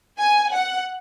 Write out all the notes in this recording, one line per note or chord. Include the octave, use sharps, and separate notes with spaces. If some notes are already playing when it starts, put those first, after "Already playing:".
G#5
F#5